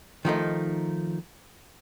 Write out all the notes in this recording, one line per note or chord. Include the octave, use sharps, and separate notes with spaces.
D#3 F3 A3 D#4